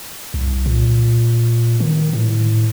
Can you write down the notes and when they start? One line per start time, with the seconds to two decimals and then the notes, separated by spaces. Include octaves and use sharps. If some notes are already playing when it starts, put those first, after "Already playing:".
0.34 C2
0.66 A#2
1.80 D#3
2.13 A2